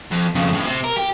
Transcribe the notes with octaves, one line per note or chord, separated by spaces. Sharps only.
F2
F2 C#3
A2 C#3
C3
A#4
G4